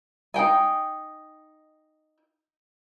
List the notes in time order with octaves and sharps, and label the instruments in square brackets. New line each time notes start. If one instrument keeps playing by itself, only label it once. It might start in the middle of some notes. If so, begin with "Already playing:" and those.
[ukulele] D#4 F#4 G5 G#5